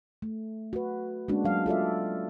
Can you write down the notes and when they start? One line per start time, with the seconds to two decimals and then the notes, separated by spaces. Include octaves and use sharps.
0.22 A3
0.73 F#4 B4
1.28 G#3 A#3 C#4 D4 F#4
1.45 F#3 F5
1.66 F4 A4 D5 E5